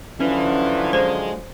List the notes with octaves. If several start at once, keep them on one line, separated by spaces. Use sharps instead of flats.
D3 F3 F#3 C#4 E4 B4
G#3 C5